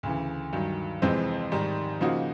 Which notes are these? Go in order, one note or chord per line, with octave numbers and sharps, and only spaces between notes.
D2 C#3 E3
G2 D#3 F#3
F2 C3 E3 G#3 C4
G#2 D#3 G3
C#3 F3 A#3 D#4 F#4